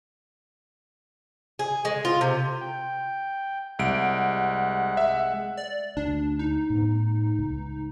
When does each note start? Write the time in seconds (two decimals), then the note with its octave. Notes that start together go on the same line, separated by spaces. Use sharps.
1.59 G#4
1.85 G#3
2.05 F4
2.21 C3
2.61 G5
3.79 C2 G#3 F#5 D7
4.97 E5
5.57 D5
5.97 D2 D4
6.39 D#4
6.70 A2 B3
7.39 C#2